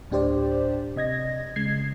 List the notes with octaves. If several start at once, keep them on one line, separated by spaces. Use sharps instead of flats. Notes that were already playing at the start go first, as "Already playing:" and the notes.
D2 A2 D4 G4 C5 D5
C3 D#5 G#6 A#6
C#3 G#3 G#6 C7